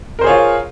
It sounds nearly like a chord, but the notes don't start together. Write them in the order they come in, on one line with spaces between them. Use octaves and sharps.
A#4 C5 G#4 C#5 F4